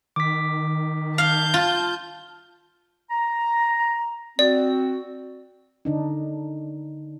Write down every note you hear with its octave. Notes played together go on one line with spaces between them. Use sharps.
D#3 D6 B6
F5 A5 G6
F4
A#5
C4 F#4 D5
D3 D4 D#4